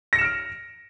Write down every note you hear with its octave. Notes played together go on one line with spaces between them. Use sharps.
F6 A#6 C#7 D7 E7